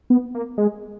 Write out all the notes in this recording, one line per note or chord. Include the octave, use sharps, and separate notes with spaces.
B3
A#3
G#3